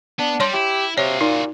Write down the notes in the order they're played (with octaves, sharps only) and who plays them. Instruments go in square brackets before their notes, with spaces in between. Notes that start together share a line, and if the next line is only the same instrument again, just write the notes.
[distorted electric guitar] B3 [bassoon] D4
[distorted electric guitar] G3 [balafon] C#5 C6
[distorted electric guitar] E4 [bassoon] G4
[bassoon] C3 [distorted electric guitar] F#4 F5 [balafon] C#5
[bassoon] A#2 [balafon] D#4